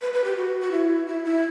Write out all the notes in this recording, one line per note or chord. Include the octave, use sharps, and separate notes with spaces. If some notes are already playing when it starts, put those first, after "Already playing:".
B4
B4
G4
F#4
F#4
E4
E4
E4